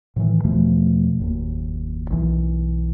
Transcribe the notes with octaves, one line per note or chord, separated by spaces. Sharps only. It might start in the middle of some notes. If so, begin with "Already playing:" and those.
A2 D#3 E3
E2 B2 F3 A3
F#1 D#2 A#2
B1 F#2 E3